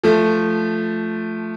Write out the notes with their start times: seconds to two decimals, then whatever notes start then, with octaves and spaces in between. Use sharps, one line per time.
0.04 F3 A3